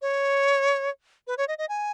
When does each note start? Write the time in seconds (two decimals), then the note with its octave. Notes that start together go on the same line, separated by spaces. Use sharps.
0.02 C#5
1.27 B4
1.38 C#5
1.48 D#5
1.58 D#5
1.69 G#5